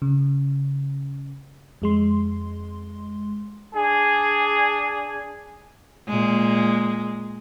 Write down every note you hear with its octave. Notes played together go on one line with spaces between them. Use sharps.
C#3
F2 G#3 C6
D4 G#4
A#2 G#3